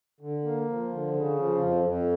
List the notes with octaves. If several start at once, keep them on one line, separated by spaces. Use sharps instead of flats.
D3
A#3
F3
D3
C#3
F3
F2
F2